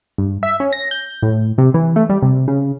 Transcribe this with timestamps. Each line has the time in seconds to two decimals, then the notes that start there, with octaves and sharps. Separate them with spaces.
0.18 G2
0.43 E5
0.60 C#4
0.73 A#6
0.91 G6
1.22 A2
1.58 C3
1.74 E3
1.96 A3
2.09 G3
2.22 C3
2.48 C#3